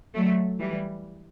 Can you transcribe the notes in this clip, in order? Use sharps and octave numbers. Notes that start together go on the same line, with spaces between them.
F#3 A3
E3 G3